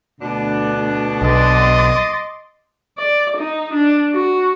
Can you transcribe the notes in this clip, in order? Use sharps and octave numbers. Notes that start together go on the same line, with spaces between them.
D2 B2 D4
B1 D#5 C6 D6 A6
D5
D#4
D4
F#4